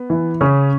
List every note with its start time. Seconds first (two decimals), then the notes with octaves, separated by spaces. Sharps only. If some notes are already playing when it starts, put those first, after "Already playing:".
Already playing: B3
0.10 E3
0.41 C#3 C#4